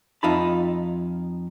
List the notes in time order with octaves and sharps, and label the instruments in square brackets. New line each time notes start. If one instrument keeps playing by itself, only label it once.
[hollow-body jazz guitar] F2 D#4 F4 E5 A5 B5